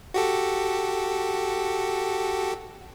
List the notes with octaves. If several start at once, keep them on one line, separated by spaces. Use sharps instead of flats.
F#4 G4 A4